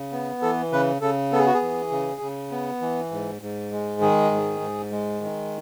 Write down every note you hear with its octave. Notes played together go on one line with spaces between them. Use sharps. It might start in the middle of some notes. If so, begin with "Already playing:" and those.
Already playing: C#3
B3
E3 A4
C#3 B4
C#3 A4
B3 A4
G#4
F#4
G#4
E3
C#3
C#3
B3
E3
G#2
G#2
G#3
D#3 G#4
G#2
G#2
G#3
D#3